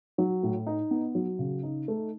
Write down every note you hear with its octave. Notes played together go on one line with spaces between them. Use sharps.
F#3
A2
D#4
B3
F#3
C#3
D#4
A3